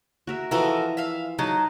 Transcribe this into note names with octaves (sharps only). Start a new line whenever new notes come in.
F#4 A#4 E5
E3 F3 F#4 A4 A#4 D#5
E5 F5
F#3 D#4 D#5 A5